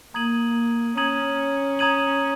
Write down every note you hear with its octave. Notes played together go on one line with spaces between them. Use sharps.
A#3 A#5 D#6 G#6 D#7 F#7
C#4 A#5 D#6 G#6 D#7 F#7
A#5 D#6 G#6 D#7 F#7